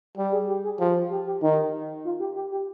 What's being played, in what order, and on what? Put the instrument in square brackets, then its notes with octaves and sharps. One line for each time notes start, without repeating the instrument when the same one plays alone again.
[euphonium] G3 [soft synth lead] G4
[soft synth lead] G#4
G4
G#4
[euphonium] F3 [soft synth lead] G4
[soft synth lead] F4
G4
G4
[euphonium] D#3 [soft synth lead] D#4
[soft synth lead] F4
G4
G4
G4